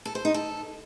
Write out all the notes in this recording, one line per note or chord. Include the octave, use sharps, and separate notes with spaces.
A4
C5
D#4
A4